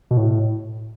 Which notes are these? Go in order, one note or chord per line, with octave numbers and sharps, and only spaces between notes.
B2
A2